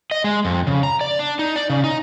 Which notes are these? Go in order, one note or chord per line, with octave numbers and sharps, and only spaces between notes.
D#5
G#3
F2
C#3
A#5
D5
D4
D#4
D5
C#3
D#4